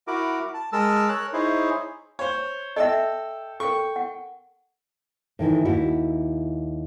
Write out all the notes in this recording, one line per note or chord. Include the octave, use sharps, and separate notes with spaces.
E4 F#4 A#4 D6
A5
G#3 A#4 A5 E6
A#4 C#5 F#6
D#4 E4 G#4 C5 C#5
C5 C#5
A4 D#5 E5 G5 E6
A4 A#4 G5 C#6
F#5
A2 D#3 E3
D#2 E4 F#4